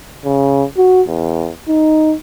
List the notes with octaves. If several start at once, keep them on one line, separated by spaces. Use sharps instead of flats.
C#3
F#4
E2
D#4